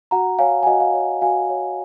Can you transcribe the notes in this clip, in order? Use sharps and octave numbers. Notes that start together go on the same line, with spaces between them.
F#4 F#5 A#5
C#5 F5 G#5
G#5
F#4 D#5 F#5
F5
C#5
F#4 F5 G#5
C#5